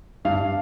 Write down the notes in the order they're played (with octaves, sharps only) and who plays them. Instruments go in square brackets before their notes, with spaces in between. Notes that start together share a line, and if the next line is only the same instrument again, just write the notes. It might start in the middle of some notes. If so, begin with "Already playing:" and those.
[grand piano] G2 F5